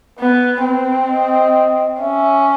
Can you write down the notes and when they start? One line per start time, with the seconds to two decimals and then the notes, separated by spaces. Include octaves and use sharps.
0.19 B3 B4
0.64 C4
1.10 D#5
2.00 C#4 E5